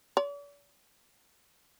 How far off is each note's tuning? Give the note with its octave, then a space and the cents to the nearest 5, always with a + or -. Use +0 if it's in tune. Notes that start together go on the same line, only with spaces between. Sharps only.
D5 -45